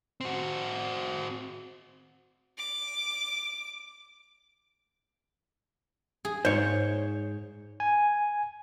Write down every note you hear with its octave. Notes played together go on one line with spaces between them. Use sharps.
C4 F#4
D6
G#4
G#2 C5 C#5
G#5